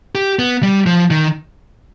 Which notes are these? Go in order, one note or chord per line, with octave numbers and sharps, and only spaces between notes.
G4
B3
G3
F3
D#3